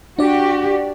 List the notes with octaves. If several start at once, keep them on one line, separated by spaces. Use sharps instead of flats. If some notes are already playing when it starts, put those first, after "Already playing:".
D4 F#4 G4 D5